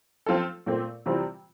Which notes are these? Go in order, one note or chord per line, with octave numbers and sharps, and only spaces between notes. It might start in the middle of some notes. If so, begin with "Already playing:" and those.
F3 C4 F4 A4
A#2 A3 C4
C3 E3 G3 C4 F4